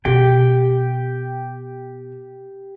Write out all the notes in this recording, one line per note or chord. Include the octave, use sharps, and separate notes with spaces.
B2 G4 G5